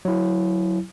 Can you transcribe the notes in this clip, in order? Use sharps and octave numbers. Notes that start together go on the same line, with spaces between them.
F#3 E4